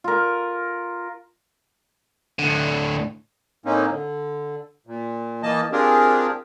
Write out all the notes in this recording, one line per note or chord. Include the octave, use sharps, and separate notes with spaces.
F4 A#4
A2 D3
A2 A#3 C4 C#4 D#4
D3
A#2
E3 A#3 D#5 A5
C4 D4 F4 G4 G#4 A#4